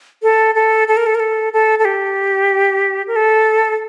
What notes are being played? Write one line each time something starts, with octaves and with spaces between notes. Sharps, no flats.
A4
A4
A4
A#4
A4
A#4
A4
A4
A4
G4
A#4
A4